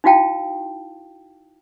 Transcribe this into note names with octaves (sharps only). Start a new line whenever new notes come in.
D#4 E4 F#4 F5 G5 A5